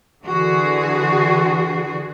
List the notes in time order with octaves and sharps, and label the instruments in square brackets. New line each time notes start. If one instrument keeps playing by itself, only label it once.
[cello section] D3 E3 F#4 G#4